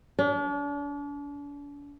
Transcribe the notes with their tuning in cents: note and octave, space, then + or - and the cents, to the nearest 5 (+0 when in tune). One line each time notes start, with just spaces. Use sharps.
D4 -40